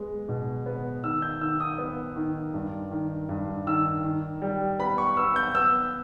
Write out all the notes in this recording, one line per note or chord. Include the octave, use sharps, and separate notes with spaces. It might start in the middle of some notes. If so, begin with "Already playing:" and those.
Already playing: G#3 B3
B2
B3
D#3 E6
G6
D#3 E6
D#6
B3
D#3
G2
D#3
G2
D#3 E6
D#3
G3
B3 B5
C#6
B3 E6
G6
B3 E6